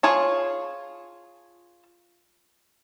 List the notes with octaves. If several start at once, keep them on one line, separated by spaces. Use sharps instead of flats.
F4 G#4 C#5 A5